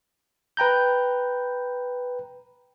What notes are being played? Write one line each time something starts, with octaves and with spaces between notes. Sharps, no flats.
B4 G5 A#5 G6